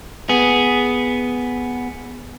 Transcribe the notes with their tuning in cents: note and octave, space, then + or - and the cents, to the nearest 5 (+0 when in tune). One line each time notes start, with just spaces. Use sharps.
B3 +0 G#4 +0